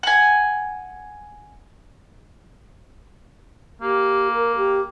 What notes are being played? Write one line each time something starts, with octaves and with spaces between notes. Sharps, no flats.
F#5 G#5
A#3 G4
A#4
G4